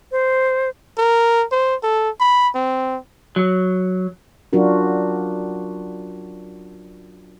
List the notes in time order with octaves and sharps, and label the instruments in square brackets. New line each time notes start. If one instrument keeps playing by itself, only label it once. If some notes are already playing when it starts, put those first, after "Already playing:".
[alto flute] C5
[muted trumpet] A#4
C5
A4
B5
C4
[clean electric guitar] F#3
[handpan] F#3 C#4 D4 F4 F#4 A#4